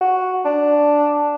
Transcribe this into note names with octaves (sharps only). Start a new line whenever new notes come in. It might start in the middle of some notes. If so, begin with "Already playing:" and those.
F#4
D4